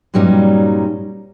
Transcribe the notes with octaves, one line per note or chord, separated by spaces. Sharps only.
G2 A#2 F#3 G3 C#4 D#4